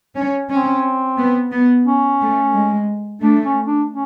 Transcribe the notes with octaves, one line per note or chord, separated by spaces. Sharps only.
C#4
C4 C#4
B3
B3
C#4
A3
G#3
A3 D4
C#4
D4
C#4